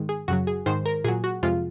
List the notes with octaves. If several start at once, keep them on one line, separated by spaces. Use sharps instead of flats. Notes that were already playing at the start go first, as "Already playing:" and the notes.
Already playing: G#2 D#3 G#3
G#4
F#2 C#3 F#3 F#4
G#4
G#2 D#3 G#3 C5
A#4
A#2 F#3 G#4
F#4
F2 C3 F3 G#3 F4